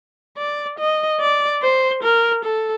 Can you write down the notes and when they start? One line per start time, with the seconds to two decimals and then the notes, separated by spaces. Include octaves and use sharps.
0.37 D5
0.79 D#5
1.20 D5
1.62 C5
2.03 A#4
2.44 A4